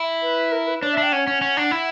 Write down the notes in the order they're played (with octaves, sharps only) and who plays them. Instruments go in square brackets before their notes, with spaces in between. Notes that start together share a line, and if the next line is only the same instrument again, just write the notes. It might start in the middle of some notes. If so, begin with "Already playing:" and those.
Already playing: [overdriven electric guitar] E4
[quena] B4
A#4
B4
[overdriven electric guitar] D4 [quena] C#5
[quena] E5
[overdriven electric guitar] D4
[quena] G5
[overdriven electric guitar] C#4 [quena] F#5
[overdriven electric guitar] C#4
C#4
D4
E4